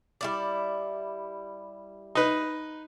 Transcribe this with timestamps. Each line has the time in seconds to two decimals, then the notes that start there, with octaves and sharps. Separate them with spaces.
0.21 G3 E4 D5
2.15 D#4 B4